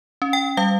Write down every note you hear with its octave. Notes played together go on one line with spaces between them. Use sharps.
C#4
G5
G3 F5